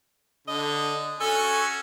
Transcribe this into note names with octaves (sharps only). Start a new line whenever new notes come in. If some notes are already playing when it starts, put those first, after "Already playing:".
D3 D#5
C#4 F#4 A4 G#5